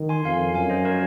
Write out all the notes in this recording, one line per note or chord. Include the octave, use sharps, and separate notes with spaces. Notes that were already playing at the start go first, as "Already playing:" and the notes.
Already playing: D#3
G#5 C6
F2 F5 G#5
F#2 F5 G#5
C5 D#5
A#4 C#5